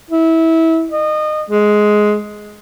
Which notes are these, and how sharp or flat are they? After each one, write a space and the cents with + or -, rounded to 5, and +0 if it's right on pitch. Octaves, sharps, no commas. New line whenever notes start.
E4 -20
D#5 -25
G#3 +10